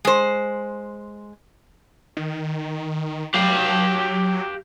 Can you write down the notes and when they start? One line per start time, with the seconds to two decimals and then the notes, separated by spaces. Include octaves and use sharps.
0.05 G#3 C5
2.17 D#3
3.34 F#3 G4 F5